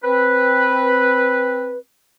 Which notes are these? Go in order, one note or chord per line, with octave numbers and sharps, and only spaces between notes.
C4 B4